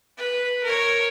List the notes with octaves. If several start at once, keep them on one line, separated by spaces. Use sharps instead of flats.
B4
A#4 C#5